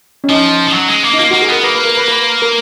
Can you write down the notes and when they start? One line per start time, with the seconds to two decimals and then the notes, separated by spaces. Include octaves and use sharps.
0.24 C#4
0.30 F3 D#4
0.68 F3
0.74 F#3
0.89 G#3
1.04 A#3
1.13 D#4
1.19 A#3 F4
1.30 A#3 F#4
1.42 G#4
1.48 B3 A#4
1.63 A#3 B4
1.75 B4
1.85 A#4
1.97 B4
2.08 B4
2.42 A#4